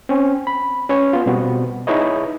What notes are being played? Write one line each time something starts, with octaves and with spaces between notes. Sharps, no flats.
C4 C#4
B5
C#4 B4 C#5
B3 F4
B2 G3 B3 C4 F#4
D#4 E4 G#4 B4 C#5 D#5